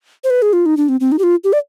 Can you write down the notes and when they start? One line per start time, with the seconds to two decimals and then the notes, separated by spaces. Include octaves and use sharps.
0.24 C5
0.30 B4
0.42 G#4
0.53 F4
0.66 D#4
0.77 D4
0.89 C4
1.00 C4
1.12 D#4
1.19 G4
1.23 F4
1.44 G4
1.53 D5